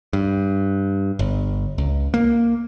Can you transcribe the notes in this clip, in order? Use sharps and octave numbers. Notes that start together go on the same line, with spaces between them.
G2
G1
C#2
A#3